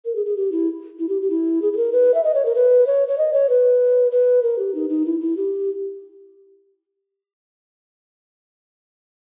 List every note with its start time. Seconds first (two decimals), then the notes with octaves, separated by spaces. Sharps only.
0.05 A#4
0.16 G#4
0.26 G#4
0.37 G4
0.52 E4
0.99 E4
1.09 G4
1.22 G4
1.30 E4
1.62 G#4
1.73 G#4
1.77 A#4
1.93 B4
2.14 E5
2.24 D#5
2.35 C#5
2.45 A#4
2.55 B4
2.87 C#5
3.08 C#5
3.18 D#5
3.33 C#5
3.49 B4
4.12 B4
4.43 A#4
4.59 G4
4.75 D#4
4.90 D#4
5.06 E4
5.21 E4
5.37 G4